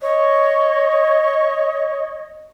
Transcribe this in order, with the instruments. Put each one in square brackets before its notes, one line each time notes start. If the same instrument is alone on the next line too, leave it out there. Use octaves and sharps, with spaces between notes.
[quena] C#5 [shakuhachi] D#5